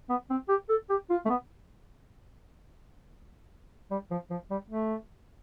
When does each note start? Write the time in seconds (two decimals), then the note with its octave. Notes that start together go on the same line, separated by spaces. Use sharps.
0.10 B3
0.30 C4
0.49 G4
0.69 A4
0.90 G4
1.10 F4
1.26 A3
1.30 B3
3.91 G3
4.11 F3
4.31 F3
4.51 G3
4.71 A3